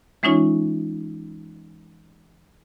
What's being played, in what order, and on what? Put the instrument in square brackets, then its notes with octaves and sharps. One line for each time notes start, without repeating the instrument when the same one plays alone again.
[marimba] E3 G#3 C#4 D#4 F4 C#5